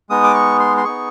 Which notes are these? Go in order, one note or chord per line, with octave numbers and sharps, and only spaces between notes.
G#3 B3 D#4 D#6
D6
C#6
C6
C6
B3 D#4 G#4 C#6